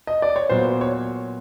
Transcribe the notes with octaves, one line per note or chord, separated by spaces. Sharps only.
D#5
D5
C#5
A#2 F#3 B3 C5
C#5